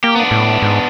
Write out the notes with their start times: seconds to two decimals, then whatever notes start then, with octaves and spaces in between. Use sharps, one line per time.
0.04 A#3 G4
0.16 B3 D4
0.31 A2
0.62 G#2